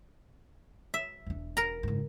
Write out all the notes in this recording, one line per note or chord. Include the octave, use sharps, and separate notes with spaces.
E5
E1 D4
A#4 A#5
F#1 G#2